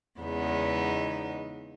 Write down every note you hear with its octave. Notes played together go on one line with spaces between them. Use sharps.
E2 C#3 G#3 B3 D#4